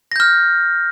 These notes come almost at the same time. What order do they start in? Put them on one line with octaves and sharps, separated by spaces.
A#6 G6 F6